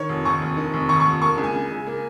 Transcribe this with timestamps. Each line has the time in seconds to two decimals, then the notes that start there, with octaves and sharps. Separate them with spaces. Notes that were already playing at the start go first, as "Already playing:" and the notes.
Already playing: D#3 C#5
0.09 F1
0.25 D#2 C#6
0.42 F1
0.57 D#3
0.74 F1
0.89 D#2 C#6
1.00 C#6
1.05 F1
1.21 A#3 C#6
1.38 C#2
1.44 G#5
1.54 C#3
1.70 C#2
1.87 A#3